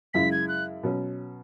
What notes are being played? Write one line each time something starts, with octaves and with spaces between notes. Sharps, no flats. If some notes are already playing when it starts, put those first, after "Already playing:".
F#2 C#3 G#3 E4 B6
G#6
F#6
B2 F#3 C#4